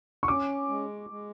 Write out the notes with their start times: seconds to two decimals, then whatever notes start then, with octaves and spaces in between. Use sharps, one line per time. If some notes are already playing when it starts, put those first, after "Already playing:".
0.23 C#6
0.28 C#4 D6
0.69 G#3
1.10 G#3